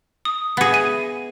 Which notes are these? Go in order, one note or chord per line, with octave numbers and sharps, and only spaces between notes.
D#6
B3 G#4 F5 A#6
E5 G#5 D#7